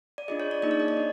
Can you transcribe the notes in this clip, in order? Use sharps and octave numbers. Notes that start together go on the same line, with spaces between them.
D5
D4 F4 G#4 D#5
C#5
D5
A#3 D#4 G#4 D#5
C#5
D#5
D5
D4